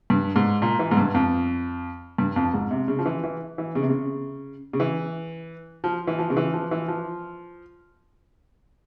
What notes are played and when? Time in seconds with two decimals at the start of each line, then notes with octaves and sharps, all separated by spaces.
0.10 G2
0.36 G#2
0.62 A#2
0.79 E3
0.91 G#2
0.97 G2
1.14 F2
2.18 G2
2.36 F2
2.54 G#2
2.71 C3
2.88 C#3
2.99 F3
3.06 E3
3.23 E3
3.58 E3
3.75 C#3
3.83 C3
3.89 C#3
4.73 C#3
4.80 E3
5.84 F3
6.07 E3
6.19 F3
6.30 C#3
6.37 E3
6.54 F3
6.71 E3
6.88 F3